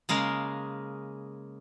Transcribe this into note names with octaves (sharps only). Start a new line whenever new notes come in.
C#3 G#3 A#3 A#4